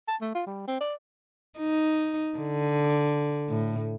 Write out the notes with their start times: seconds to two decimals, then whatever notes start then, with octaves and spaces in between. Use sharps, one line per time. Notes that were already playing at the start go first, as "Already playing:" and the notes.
0.08 A5
0.21 A3
0.35 F4
0.47 G3
0.68 C4
0.80 D5
1.59 D#4
2.38 D3
3.49 A2